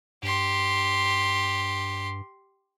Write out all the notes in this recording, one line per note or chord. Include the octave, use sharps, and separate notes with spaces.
G2 G4 C6